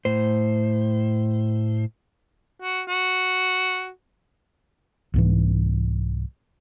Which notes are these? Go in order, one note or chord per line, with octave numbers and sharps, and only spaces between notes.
A2 C5
F#4
F#4
C2 G#2 E3